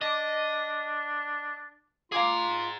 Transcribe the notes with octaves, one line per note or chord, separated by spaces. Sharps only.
D4 D#5 A5 D6
F4 G#4 F5 G#5 A#5 D6